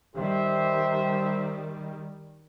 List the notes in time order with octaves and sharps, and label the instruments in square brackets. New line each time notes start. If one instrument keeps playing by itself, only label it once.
[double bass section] D#3 G3 [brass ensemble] G4 C5 E5